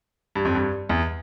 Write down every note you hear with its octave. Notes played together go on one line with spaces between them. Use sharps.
G2
F2
G2
E2